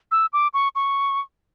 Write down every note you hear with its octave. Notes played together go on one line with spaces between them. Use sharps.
E6
D6
C#6
C#6